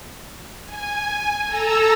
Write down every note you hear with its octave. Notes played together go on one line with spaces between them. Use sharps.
G#5
A4 A#5 E6